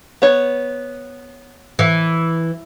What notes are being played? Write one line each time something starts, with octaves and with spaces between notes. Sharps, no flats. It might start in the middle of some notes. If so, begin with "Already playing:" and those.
B3 C#5
E3